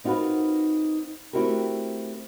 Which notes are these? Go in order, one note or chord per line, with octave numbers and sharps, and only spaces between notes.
C4 D#4 F4 F#4 A#4 B4
A3 C4 E4 F#4 G4 A#4